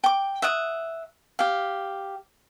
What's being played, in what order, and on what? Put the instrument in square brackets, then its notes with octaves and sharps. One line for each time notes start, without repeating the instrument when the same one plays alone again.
[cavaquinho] G5 D6
E5 F#5 D#6
G4 F5